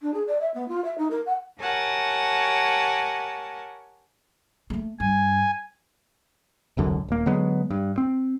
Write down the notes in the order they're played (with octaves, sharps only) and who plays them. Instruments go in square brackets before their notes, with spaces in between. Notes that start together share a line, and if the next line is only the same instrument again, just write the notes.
[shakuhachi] D4
G#4
D5
E5
B3
F4
E5
D#4
A#4
F#5
[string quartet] G4 A#4 C#5 F#5 G#5 A5
[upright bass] G#3 A3
[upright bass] G2 [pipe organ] G#5
[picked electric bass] E1 C2 F#2 D3
D#1 A#3
D3 F#3 G#3 B3
G2
C4